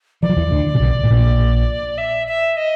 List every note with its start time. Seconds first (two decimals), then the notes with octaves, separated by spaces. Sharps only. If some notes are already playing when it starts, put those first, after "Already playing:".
0.22 E3 D5
0.29 F3
0.36 E2 E3
0.51 D2 D3
0.75 C3
0.80 B1 B2
1.03 A2
1.10 A#1 A#2
1.98 E5
2.28 E5
2.57 D#5